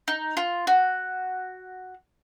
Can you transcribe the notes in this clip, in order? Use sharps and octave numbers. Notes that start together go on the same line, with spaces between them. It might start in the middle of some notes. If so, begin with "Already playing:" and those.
D#4
F4
F#4